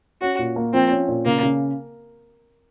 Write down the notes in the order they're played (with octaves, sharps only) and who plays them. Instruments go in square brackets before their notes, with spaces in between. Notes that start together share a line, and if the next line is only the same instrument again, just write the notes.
[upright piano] C#4 [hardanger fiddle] F#4
[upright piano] A#2
A#3
[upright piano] F3 [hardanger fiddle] C4
[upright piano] C#4
A#2
[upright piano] C#3 [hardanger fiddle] A#3
[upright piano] C#3